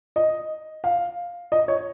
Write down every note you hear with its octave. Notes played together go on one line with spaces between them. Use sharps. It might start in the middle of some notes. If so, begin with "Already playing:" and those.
D#5
F5
D#5
C#5